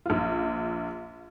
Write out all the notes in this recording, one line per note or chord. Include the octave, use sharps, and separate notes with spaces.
A#1 F4